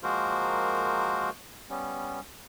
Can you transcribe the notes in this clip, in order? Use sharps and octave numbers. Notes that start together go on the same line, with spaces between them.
F3 G#3 A#3 F#4 A#4 C5
G3 B3 C#4